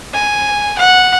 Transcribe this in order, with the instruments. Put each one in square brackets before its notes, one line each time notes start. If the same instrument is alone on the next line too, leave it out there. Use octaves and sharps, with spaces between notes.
[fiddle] G#5
F#5